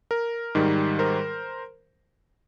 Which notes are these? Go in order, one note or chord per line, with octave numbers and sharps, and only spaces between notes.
A#4
G#2 D#3 G3
A#4 C5